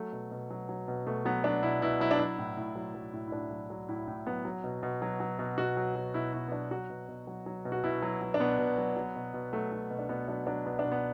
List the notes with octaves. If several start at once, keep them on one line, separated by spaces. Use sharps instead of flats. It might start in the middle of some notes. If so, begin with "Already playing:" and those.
Already playing: F#3 A3
B2
B2
F#3
F#3
B2
B2 A3
F#3 B3
F#3 D4
B2 E4
B2 E4
F#3 E4
D4
F#3 E4
A2
A2
F#3
F#3
A2
E4
A2 D4
F#3
F#3
A2 E4
A2
F#3 B3
F#3
B2
B2
F#3
F#3
B2
B2 F#4
F#3
F#3
B2 E4
B2 E4
B3
F#3 D4
F#3 F#4
B2
B2
F#3
F#3
B2
F#4
B2 E4
F#3
F#3
D4
B2 B3
B2
F#3
F#3
B2
B2
F#3 A3
F#3
B2
D4
B2 B3
F#3 D4
F#3 D4
B2 B3
D4
B2
B3